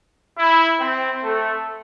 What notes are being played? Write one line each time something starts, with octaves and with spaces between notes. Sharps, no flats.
E4
C4
A3